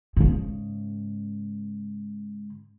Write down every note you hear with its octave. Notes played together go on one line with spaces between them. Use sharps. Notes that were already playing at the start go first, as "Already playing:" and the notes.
G#2 C#3